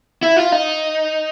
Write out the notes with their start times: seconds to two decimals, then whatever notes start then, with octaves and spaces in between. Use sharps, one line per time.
0.23 E4
0.37 F4
0.52 D#4